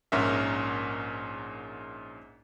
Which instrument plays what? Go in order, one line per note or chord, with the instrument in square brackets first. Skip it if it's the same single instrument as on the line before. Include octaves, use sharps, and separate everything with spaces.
[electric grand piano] A#1 G#2 C#4 A#4 E5